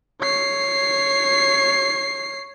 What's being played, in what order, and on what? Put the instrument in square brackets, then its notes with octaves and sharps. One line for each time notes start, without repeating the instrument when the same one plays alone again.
[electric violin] C#5 C7